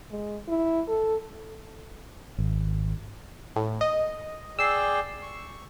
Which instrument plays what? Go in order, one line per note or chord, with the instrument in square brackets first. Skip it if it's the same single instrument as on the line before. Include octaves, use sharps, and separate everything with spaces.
[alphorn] G#3
E4
A4
[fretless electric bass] G#1
[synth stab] A2
D#5
[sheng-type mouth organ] G#4 D5 G5 [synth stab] E6 C7
[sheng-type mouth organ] C#6